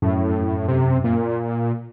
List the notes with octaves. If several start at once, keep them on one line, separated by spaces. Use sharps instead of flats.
F#2 A2
C3
A#2